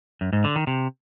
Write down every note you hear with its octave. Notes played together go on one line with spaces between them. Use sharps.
F#2
G#2
D3
D#3
C3